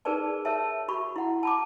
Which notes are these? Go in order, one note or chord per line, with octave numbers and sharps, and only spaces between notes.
D#4 G#4 A#4 B4 D5 A5
A#4 C#5 E5 A5
F#4 B5 C#6
E4 F#5
A5 B5 D6